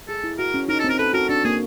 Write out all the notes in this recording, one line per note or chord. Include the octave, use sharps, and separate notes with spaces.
G#4 A4
E4
F#4 A#4
C#4
D#4 A#4
A4
C4
A#4
A4 B4
F#4 A#4
D4 A4
A#3 G#4